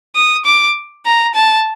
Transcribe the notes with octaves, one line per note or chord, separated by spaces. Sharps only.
D#6
D6
A#5
A5